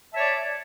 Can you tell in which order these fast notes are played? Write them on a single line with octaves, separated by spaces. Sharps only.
E5 A5 C#5 D5